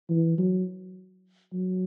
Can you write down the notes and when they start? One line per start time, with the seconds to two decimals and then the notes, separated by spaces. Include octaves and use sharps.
0.09 E3
0.38 F#3
1.53 F#3